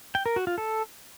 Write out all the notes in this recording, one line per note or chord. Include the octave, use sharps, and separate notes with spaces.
G5
A#4
F#4
F4
A4